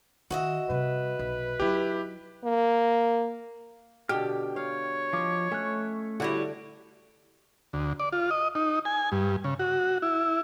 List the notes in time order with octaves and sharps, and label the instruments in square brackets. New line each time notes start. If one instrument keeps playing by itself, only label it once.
[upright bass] D#3 [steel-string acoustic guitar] F#4 D#5 E5
[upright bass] C3 G3 [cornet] B4
[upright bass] B1
[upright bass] F#3 D#4 [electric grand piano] E4 G4
[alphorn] A#3
[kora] B2 D3 [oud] G4 [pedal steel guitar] G5 F6
[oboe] C#5 [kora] F5
[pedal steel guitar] F3 D6 [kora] F4 D#5
[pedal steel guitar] A3 F#6 [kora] C#4
[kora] D3 [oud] G3 E4 F#4
[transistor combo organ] D2
D5
F4
D#5
D#4
G#5
G2
C#3
F#4
E4